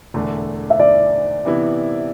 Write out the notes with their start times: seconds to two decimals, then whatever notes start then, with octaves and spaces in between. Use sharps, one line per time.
0.14 E1 E2 D3 A3
0.70 E5
0.80 D5
1.45 C3 E3 B3 E4